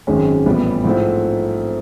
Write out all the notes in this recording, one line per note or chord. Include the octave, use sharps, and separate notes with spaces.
G#1 F#2 D#3 G#3 C#4
A#1 A2 E3 G3 B3
G#2 F3 A3 C4 E4